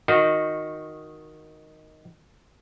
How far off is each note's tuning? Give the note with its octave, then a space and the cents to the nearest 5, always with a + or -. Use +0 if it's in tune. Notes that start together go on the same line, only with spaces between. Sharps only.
D#3 +0 D#4 +0 F#4 -20